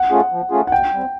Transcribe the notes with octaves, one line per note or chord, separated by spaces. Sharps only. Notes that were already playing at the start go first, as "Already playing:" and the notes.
Already playing: F#5
A3 C#4 F4 G#4
F3
A3 C#4 F4 G#4
F#5
B2 G5
G3 C4